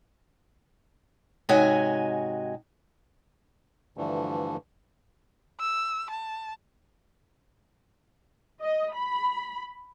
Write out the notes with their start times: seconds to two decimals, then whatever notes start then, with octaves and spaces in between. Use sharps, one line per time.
1.49 G#2 C3 F#4 C#5 D#5 G#5
3.97 G2 D3 E3 F3 A3
5.60 E6
6.10 A5
8.62 D#5
8.95 B5